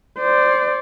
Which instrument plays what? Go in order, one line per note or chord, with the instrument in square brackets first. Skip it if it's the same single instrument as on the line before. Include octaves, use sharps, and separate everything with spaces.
[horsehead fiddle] C5 D5